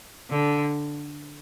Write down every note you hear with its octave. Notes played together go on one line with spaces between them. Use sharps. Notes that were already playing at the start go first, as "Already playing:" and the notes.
D3